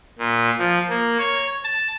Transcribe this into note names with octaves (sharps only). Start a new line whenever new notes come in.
A#2
F3
A#3
C#5
A5